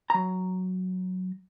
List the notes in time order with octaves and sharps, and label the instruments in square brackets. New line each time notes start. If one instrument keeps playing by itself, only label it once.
[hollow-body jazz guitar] F#3 A#5